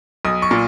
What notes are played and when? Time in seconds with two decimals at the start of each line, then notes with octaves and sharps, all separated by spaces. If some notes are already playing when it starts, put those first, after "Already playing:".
0.25 B1 D#6
0.42 C#6
0.51 A#2